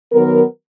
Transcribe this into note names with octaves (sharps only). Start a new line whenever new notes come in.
D#3 F#3 B3 A#4